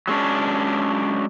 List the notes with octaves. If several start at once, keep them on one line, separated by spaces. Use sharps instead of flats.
F#3 G#3 C#4 D4